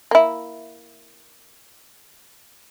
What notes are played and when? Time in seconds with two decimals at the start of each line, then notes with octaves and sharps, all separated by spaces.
0.11 A#3 E4